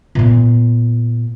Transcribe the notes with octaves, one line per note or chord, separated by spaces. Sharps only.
A#2 B3